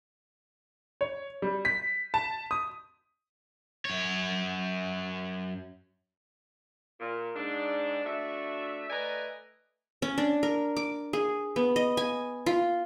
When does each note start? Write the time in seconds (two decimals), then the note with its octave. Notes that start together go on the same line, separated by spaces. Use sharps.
1.01 C#5
1.42 G3
1.65 B6
2.14 A5
2.51 D#6
3.85 F#2 C#5
7.00 A#2
7.36 G#2 D4
8.05 A3 D4 F#4 E5
8.90 A3 B4 D5 D#5 G#5 A#5
10.02 C#4
10.18 D4
10.43 A#4
10.76 D6
11.13 G#4
11.56 B3
11.76 D#5
11.97 G#5
12.46 F4